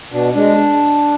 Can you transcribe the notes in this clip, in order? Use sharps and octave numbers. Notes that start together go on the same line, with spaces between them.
B2 D4
G#3 D4